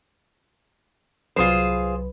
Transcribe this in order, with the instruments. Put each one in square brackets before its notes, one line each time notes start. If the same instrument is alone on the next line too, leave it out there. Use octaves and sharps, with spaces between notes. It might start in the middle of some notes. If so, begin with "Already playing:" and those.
[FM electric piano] C2 F#3 B4 [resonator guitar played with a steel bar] F4 G#4 C5